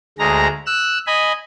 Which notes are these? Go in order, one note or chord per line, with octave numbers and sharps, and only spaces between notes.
D2 G#3 A#5
E6 F#6
D#5 G#5 B5